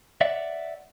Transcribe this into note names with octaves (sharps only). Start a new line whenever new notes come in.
C#5 D5 E5 F#5